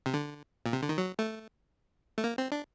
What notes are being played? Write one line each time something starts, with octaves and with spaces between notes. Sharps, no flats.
C3
D3
A#2
C3
D3
D#3
F#3
A3
A3
A#3
C4
D4